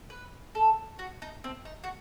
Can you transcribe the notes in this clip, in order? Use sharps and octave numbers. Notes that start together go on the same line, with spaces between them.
B4
A4
F#4
D#4
C4
D#4
F#4